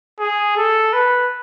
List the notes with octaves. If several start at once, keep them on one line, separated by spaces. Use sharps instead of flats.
G#4
A4
B4